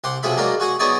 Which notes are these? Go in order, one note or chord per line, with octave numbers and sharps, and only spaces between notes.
C2 G4 F#5 C6
B1 C3 F3 G#4 E5 B5
F#3 G#3 A#3 D4 F4 A#4
F#4 G#4 F#5
F#3 B3 D#4 G#4 C#5 D5